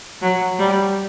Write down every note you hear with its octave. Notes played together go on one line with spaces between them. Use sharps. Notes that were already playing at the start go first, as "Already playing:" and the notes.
F#3
G3